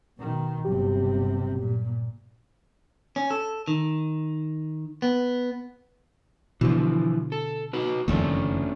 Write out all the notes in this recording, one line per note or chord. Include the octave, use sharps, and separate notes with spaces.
B2 D#3
G1 C3 F#3 G4
A#2
C#4
A4
D#3
B3
B2 D3 E3 F3
A4
D#4 F#4 B4
F#1 F2 D#3 A3 C#4 D4